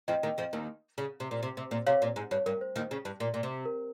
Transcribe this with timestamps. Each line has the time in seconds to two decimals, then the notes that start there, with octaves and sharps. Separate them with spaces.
0.08 F2 F3 D#5 G5
0.23 D#2 D#3
0.38 F2 F3
0.53 D#2 D#3
0.98 C#3
1.20 C3
1.31 A#2
1.43 C3
1.57 C3
1.71 A#2
1.87 C3 C#5 F5
2.02 A#2
2.16 G#2
2.31 G2 C#5
2.46 G2 A#4
2.61 C5
2.76 D#2 D#3
2.91 C#3
3.05 G2
3.20 A#2
3.34 A#2
3.43 C3
3.65 A#4